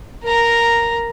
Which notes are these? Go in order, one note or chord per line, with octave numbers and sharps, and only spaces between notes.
A#4 A#5